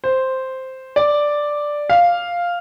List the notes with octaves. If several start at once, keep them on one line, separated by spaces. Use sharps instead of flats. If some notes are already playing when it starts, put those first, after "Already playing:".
C5
D5
F5